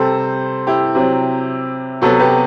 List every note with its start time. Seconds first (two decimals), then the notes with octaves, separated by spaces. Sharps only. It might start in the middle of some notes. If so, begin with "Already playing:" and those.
Already playing: C3 G3 C4 A4 C5
0.67 E4 G4
0.95 C3 F#3 C4
2.02 C3 F#3 B3 F#4 A4
2.19 G4 B4